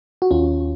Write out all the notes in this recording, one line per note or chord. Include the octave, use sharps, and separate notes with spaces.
F#4
D#2 C#4 F4